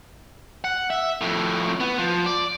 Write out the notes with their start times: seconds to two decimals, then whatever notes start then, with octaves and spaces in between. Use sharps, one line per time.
0.64 F#5
0.90 E5
1.21 F2 A2
1.80 B3
1.99 F3
2.26 D5